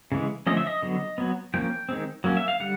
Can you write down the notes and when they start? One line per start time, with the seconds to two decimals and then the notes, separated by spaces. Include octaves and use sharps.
0.12 C#3 E3 G#3
0.47 D3 F3 A3 C#4 D#5
0.57 E5
0.67 D#5
0.82 D3 F#3 B3
1.18 F#3 B3
1.54 F3 A#3 C#4 G5
1.89 D#3 G#3 C4
2.24 F#3 A#3 C#4
2.37 E5
2.48 F5
2.60 D3 G3 F#5